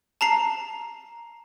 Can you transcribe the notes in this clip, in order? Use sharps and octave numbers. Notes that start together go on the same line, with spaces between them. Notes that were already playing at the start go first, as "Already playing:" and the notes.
A5 A#5 C7